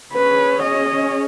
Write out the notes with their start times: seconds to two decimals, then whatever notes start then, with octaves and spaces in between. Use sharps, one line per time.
0.13 C#4 G#4 B4 C#5
0.63 D#5